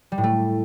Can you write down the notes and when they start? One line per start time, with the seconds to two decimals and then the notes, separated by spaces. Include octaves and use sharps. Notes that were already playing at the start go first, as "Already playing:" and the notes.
0.12 G3
0.18 A2
0.24 A3